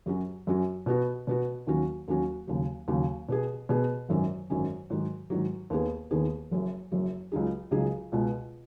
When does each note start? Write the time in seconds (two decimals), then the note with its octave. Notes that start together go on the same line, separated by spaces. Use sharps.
0.06 F#2 F#3 C#4 F#4
0.47 F#2 F#3 C#4 F#4
0.86 B2 B3 F#4
1.27 B2 B3 F#4
1.67 D#2 D#3 F#3 C#4 F#4
2.08 D#2 D#3 F#3 C#4 F#4
2.47 D#2 C#3 F#3
2.88 D#2 C#3 F#3
3.29 B2 B3 G#4
3.69 B2 B3 G#4
4.09 G#1 F#2 D#3 F#3 C#4
4.50 G#1 F#2 D#3 F#3 C#4
4.90 G#2 D#3 F#3
5.30 G#2 D#3 F#3
5.70 D#2 D#3 B3 G#4
6.11 D#2 D#3 B3 G#4
6.51 F#1 F#2 F#3
6.92 F#1 F#2 F#3
7.32 C#2 C#3 F#3 D#4 G#4
7.71 C#2 C#3 F#3 D#4 G#4
8.12 C#2 B2 G#3